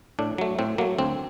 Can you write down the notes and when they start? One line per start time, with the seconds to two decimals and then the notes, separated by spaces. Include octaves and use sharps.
0.19 A2 D4
0.38 F#3 A3
0.59 A2 C4
0.78 F#3 A#3
0.81 A3
0.99 D2 C4